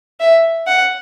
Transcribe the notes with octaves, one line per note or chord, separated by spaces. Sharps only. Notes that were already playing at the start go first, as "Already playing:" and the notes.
E5
F#5